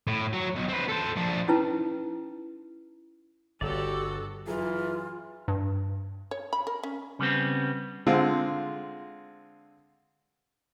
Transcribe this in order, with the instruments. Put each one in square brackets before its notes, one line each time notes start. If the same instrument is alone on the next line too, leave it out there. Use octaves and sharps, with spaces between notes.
[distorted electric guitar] A2
F#3
B1
C4 B4
A4 C5
F3 D4
[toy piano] C#4 D#4 E4 B4 A5
[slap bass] G1 [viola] F#4 A4 [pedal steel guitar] G4 D5
[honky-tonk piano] F#2 G#4 [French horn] E3 [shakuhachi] F4
[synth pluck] G2
[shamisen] C#5
B5
A#4
C#4
[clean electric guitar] C#3 G3 B3 C4
[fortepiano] D3 G#3 C4 F4